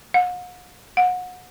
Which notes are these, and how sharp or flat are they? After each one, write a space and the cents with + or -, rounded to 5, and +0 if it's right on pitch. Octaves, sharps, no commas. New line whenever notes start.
F#5 -45
F#5 -30